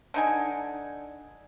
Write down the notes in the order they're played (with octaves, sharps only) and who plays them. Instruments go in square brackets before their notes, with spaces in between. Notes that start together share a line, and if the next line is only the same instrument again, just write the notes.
[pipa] D3 D#4 G#5